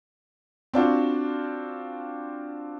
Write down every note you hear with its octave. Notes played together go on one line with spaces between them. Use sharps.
C4 D4 F4 F#4